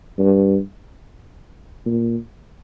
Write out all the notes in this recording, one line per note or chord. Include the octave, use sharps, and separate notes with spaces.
G2
A#2